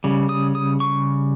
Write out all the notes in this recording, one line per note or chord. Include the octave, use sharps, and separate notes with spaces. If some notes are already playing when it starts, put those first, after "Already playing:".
C#3 G3
D#6
D#6
C#6